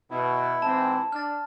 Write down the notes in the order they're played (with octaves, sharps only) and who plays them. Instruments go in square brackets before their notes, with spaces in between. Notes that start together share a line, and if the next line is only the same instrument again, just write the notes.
[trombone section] B2 [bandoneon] E4
[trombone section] G#2 E3 C4 [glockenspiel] A5
[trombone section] D4 [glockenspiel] F6 A6